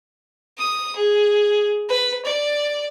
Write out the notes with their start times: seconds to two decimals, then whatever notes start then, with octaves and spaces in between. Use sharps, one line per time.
0.58 D#6
0.96 G#4
1.89 B4
2.25 D5